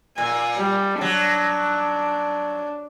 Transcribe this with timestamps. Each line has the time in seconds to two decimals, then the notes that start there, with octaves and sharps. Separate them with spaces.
0.18 A#2 G#5
0.56 G3
1.01 F#3 D4